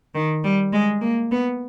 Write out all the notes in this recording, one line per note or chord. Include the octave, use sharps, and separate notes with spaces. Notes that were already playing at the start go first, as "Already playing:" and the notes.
D#3
G3
G#3
A#3
B3